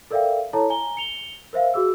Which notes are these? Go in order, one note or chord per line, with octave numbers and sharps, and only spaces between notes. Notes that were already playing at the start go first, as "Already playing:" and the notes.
A4 A#4 D5 E5 F5 G5
E4 A4 C#5 A5 A#5
G#5 A#5 G7
C#7 F7 G7
A#4 C5 E5 F5
F#4 G#4 E6